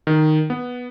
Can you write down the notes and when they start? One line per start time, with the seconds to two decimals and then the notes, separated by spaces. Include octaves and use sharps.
0.07 D#3
0.50 B3